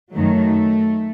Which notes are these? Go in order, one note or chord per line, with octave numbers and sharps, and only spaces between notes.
F#2 D#3 F#3 A3